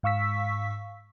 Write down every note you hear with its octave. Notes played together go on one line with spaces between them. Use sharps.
G#2 F5 C#6 E6 B6